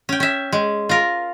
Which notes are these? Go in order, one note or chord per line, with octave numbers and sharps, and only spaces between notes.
C#4 G5
C#4 E5
G#3
F4 A#4